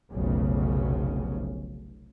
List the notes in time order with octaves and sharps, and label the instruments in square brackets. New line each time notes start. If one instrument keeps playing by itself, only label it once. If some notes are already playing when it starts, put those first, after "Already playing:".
[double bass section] F1 B1 C#3